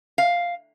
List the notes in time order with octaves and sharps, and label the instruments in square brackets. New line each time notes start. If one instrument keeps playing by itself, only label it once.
[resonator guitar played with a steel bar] F5